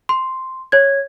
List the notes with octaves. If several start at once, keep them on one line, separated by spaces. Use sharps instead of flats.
C6
C#5 G#6